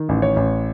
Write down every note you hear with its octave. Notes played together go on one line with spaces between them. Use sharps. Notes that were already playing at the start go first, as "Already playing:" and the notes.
Already playing: D#3
A1
C#5
A1